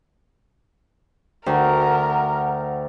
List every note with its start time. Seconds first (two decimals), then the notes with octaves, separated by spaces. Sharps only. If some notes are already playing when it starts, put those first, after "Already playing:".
1.46 D2 A#4 F#5 G5